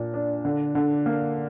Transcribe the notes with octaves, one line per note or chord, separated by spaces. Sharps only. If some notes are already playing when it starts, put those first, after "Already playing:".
Already playing: A#2 D4
D4
D3
D3
A#3